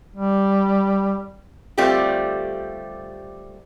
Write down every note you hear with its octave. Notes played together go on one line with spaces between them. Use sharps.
G3
D3 G3 A3 C4 F4 G4